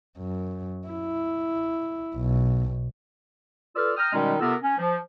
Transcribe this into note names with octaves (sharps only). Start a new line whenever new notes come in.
F#2
E4
B1
F4 A4 B4 D5 E6 F6
G5 A#5 D#6 F6
B2 D#3 G3 G#3 C#4 D#4
C3 B3 F4 A4 A#4
C#4
F3